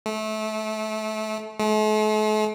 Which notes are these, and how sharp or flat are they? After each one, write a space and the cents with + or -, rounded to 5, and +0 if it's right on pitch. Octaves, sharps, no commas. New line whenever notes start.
A3 -25
A3 -45